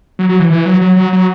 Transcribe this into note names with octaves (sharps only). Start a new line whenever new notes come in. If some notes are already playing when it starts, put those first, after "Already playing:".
F#3
F#3
E3
E3
F#3
F#3
F#3
F#3